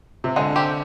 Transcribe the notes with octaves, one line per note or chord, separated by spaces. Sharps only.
C3
D3 G#3
C4 G4